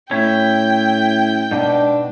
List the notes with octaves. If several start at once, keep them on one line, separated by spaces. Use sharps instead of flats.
A2 C#4 E4 G5
G#2 B2 D4